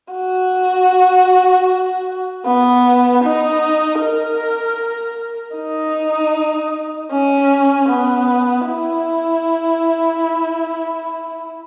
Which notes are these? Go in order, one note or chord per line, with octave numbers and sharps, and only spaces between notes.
F#4
B3
D#4
A#4
D#4
C#4
B3
E4